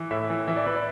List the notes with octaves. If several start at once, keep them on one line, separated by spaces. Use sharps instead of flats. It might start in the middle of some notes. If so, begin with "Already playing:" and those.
Already playing: E3
A2 E5
E3
E3 E5
D5
E3 B4
D5